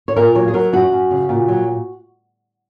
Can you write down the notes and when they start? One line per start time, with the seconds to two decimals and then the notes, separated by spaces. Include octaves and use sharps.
0.08 C#5
0.16 A#2 A#4
0.35 F#3 C#5
0.48 G#4
0.54 F#3 A#4
0.73 F#2 F#4
0.92 F#2
1.11 C#3
1.29 A#2
1.48 F#3